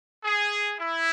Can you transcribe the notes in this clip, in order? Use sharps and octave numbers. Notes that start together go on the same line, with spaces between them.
G#4
E4